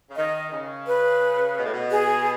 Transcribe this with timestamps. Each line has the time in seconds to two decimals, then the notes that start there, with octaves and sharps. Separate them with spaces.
0.09 C#3
0.16 D#3 D#5
0.51 C#3
0.87 B4
1.57 B2
1.64 A2
1.73 B2
1.91 G#4